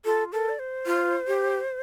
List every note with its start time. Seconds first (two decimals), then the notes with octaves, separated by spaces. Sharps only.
0.05 F4 A4
0.33 A4 A#4
0.49 D5
0.59 C5
0.86 F4
1.27 G4